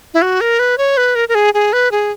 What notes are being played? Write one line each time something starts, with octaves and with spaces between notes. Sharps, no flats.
E4
F#4
A#4
B4
C#5
B4
A#4
A#4
G#4
G#4
B4
G#4